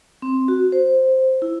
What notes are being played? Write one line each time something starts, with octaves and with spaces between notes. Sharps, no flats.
C4
F#4
C5
E4